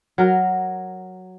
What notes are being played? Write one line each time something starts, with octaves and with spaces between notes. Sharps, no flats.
F#3 A#4